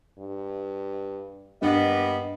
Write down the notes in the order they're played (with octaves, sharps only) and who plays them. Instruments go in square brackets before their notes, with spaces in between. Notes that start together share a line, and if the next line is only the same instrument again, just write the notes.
[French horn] G2
[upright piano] G2 [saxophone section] G3 A#3 B3 [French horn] D#5